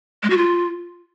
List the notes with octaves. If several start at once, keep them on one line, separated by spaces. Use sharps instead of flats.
G#3
F#4
F4